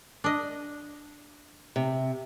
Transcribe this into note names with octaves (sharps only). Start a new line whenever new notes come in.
D4 D#5
C3